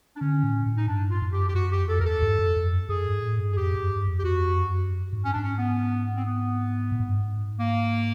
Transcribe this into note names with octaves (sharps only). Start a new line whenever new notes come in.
D4
D3 C#4
A2
A2
D#4
G2 D4
F4
F#2
G4
G4
F#2 F#4
G4
F2
A4
E2 A#4
A4
G2
F2
F2
F#2
F#2 G#4
G#2
A2
G2
G#4
F2 G4
F#2
G2
F2
G4
F2 F#4
F#2
G#2
C#4
G#2 D4
C#4
B3
C4
B3
A2
G#2
G2
G#2
A#3